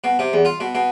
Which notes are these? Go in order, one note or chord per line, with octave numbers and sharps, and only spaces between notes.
B2
C3
E2
F4
B2
B2